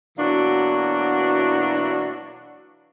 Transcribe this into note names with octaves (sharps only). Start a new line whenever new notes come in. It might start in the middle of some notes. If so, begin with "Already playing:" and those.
B2 E3 F#3 A#3 D4 F#4